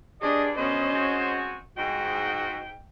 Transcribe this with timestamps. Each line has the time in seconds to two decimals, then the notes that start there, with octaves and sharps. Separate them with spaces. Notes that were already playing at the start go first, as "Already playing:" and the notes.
0.22 G2 D4 G#4 D5 D#5
0.57 B2 D3 C#4 C5 D#5
0.94 G#3 C4 F#4
1.77 G#2 F#4 G5